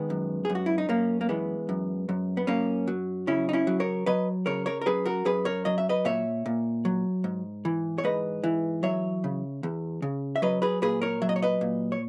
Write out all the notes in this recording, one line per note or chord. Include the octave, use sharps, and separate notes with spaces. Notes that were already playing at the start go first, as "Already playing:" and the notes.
Already playing: D#3 G#3 B3
F#2
F#2 G#4
F#4
E4
D#4
F#2 A#3 C#4
A#3
E3 G#3 B3
F#2
F#2
B3
F#2 A#3 C#4
F#3
C#3 C#4 E4
D#4
C#4 E4
F#3
A#4 C#5
F#3 B4 D#5
C#3 A#4 C#5
A#4 C#5
A#4
F#2 G#4 B4
F#4 A#4
F#2 G#4 B4
A#4 C#5
F#3 D#5
E5
B4 D#5
A#2 C#5 E5
A#2
F#3
G#2
E3
C#5
G#2 B4 D#5
E3
F#3 C#5 E5
C#3
E2
C#3
E5
F#3 B4 D#5
G#4 B4
A#2 G#4 B4
A#4 C#5
F#3 E5
D#5
C#5
B4 D#5
A#2
C#5